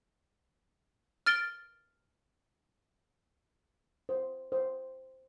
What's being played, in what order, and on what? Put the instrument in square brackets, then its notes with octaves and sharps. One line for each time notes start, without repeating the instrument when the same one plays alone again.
[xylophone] F6 A6 D7 G7
[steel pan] C5
C5